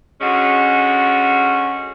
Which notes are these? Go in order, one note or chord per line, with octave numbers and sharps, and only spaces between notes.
D3 G#3 C#4 F#4